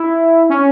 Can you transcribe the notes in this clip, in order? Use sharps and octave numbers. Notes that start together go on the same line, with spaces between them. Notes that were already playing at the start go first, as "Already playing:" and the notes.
Already playing: E4
C#4